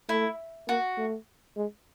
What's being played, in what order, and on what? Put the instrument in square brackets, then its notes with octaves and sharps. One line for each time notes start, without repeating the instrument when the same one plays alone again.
[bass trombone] A3 [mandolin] E4
[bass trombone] A#3 [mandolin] F#4
[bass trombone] A3
G#3